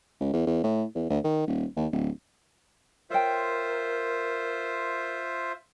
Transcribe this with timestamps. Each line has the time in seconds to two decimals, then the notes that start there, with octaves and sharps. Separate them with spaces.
0.21 C#2
0.33 E2
0.47 E2
0.64 A2
0.95 E2
1.10 D2
1.24 D#3
1.47 D#1
1.76 D#2
1.92 D1
3.10 F4 A#4 C5 C#5 E5 G5